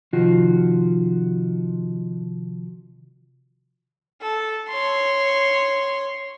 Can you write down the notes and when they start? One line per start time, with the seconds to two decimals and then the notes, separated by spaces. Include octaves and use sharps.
0.13 C3 D#3 F3 F4 F#4
4.22 A4
4.69 C#5 C6